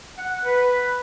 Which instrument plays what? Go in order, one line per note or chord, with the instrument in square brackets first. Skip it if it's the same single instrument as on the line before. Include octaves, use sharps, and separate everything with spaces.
[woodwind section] F#5
B4